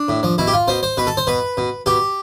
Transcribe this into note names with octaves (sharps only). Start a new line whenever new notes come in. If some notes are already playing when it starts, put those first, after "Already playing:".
Already playing: D4
A2
F3
B2 E4
G4
F4
B2 C5
C5
B2 B4
A4
C5
B2 B4
B2
B2 G4